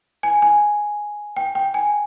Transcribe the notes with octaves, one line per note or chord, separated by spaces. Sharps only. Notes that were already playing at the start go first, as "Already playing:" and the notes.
G#5
G#5
G5
G5
G#5